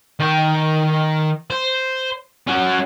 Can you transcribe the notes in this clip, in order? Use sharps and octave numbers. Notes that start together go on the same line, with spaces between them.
D#3 G5
C5
C#4 F#4